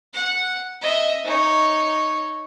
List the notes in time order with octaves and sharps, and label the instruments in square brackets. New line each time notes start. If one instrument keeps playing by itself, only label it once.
[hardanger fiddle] F#5
D#5 E5
D#4 C#5